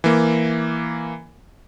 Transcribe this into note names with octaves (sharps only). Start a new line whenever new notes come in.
E3 A#3